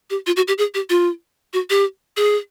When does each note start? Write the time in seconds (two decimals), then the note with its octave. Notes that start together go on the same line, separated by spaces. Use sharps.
0.10 G4
0.27 F4
0.36 F#4
0.48 G4
0.58 G#4
0.74 G4
0.90 F4
1.53 F#4
1.70 G4
2.17 G#4